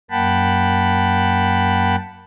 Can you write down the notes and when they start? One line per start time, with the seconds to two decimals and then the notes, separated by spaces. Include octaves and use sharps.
0.11 F#2 A#3 F#5 G5 A5 B5